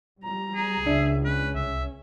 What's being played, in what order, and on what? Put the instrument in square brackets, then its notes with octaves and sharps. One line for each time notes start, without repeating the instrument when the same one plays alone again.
[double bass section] G3 [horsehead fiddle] A#5
[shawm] G#4
[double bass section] C#2 [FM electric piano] D4 [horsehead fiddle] E5
[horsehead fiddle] C#4 [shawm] B4
[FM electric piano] C2 [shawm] E5